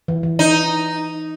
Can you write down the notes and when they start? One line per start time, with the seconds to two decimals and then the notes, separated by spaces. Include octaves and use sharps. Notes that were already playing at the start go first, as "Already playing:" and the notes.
0.08 E3
0.23 E3
0.39 D#4